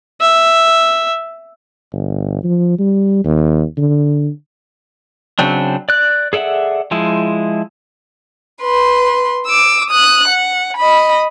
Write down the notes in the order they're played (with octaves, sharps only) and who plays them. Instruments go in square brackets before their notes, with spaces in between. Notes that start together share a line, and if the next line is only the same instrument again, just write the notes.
[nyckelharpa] E5
[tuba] G1
F3
G3
D#2
D3
[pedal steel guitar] C#3 F#3 C4 D4
D5 F#6
G#4 A4 D5 E5 F#5
F3 G#3 E4
[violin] B4 C6
D6 E6
D#6 F#6
F#5
D#5 B5